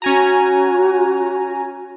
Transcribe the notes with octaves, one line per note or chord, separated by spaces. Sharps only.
C#4 F#4 G#5 A#5